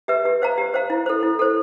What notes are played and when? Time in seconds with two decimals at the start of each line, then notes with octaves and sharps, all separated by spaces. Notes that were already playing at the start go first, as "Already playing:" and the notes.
0.08 G4 B4 E5
0.25 G4
0.42 C5 F5 A#5
0.58 G4
0.74 C5 F5 A#5
0.90 E4
1.06 A4 C5
1.23 E4
1.39 A4 C5